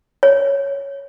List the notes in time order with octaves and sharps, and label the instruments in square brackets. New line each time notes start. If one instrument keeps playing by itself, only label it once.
[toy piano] C#5